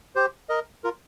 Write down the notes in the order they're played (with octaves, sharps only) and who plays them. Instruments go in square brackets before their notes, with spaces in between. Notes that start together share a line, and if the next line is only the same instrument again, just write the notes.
[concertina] G4 C5
A#4 D#5
F4 A#4